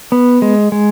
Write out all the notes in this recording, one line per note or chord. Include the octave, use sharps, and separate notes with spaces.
B3
G#3
G#3